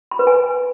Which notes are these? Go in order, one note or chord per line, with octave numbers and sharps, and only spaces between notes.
B5
B4
G#5